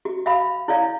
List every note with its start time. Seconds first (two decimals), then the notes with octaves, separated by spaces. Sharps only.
0.05 F#4
0.26 E5 F5 B5
0.68 E4 C#5 D5 F5